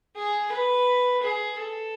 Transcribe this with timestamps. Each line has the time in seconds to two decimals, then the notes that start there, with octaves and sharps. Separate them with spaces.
0.16 G#4
0.52 B4
1.22 G#4
1.59 A4